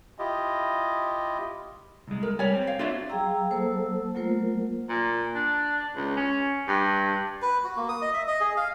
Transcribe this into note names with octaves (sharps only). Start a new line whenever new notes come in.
E4 F4 G4 D#5
C2 G#3
A#4
G3 C#5 G#5
C4
C#5 F5
D4 F4 F#4 D5 E5
F#3 G#4 F5 G5 A#5 E6
F#3 A#3 A4 C5 A5 E6
F#3 A3 A#3 F4 A#4 C5
A#2
D4
C#2
C#4
G2
B4
F#4
A#3
D#6
D#5
E5
D#5
G#4
F5